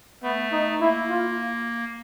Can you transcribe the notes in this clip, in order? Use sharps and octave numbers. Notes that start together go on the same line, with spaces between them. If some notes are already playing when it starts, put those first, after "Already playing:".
A3 B3
D#4
A#3 E4
F4